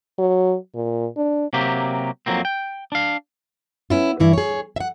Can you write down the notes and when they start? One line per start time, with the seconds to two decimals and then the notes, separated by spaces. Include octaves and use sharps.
0.18 F#3
0.75 A#2
1.17 D4
1.53 C3 F#3 A#3 G4
2.26 F2 F#3 A#3 C4
2.45 G5
2.92 D4 F5
3.90 B3 C#4 E4 F4
4.20 G2 E3 E4
4.33 G#4 C#5
4.76 E5 F#5